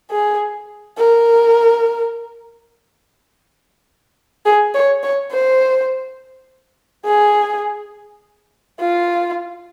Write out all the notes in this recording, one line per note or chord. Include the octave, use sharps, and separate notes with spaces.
G#4
A#4
G#4
C#5
C#5
C5
G#4
F4